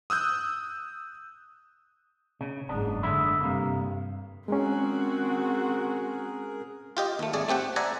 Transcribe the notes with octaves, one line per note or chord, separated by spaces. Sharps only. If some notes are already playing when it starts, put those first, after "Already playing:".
D#6 E6 F#6 G6
C#3
F#1 G#2 B3 D4
D3 G#3 B3 E4
G2 C3 A#3
G#3 C4 C#4 F#4 G#4 A#4
F4 G4 D#5
D#2 A3
G#1 A3 G#4 D5
A3 C4 G4 F#5
C5 D5 E5 F#5 G#5 A#5